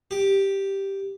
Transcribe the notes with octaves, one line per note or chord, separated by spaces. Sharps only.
G4